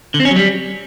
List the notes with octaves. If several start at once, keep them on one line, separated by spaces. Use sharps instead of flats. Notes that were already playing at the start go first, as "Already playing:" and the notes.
D3
C4
C#4
F#3
G3